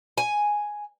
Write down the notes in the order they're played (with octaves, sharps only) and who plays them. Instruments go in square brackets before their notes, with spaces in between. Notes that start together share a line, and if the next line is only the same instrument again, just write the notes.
[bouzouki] G#5